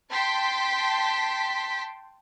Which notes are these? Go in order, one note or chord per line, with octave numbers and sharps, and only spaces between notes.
G5 A5 C6 B6